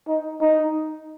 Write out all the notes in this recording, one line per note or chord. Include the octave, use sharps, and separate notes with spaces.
D#4
D#4